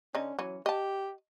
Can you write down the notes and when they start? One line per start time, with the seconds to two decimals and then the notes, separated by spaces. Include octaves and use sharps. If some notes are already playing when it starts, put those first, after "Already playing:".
0.15 D3 C#4 D#4
0.39 E3 F#3 C#4
0.66 G4 D#5 A5